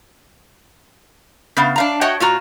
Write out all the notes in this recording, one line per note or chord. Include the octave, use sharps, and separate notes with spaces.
C#3 B3 F5
D4 F5 A#5
F#4 C#5 D#5 F#5 G5
A#2 F4 F#4 A#5